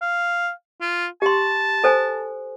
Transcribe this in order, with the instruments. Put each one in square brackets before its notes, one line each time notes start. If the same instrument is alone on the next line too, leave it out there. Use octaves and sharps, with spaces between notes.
[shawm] F5
F4
[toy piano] G4 C6 [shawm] A5
[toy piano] A4 C5 G#5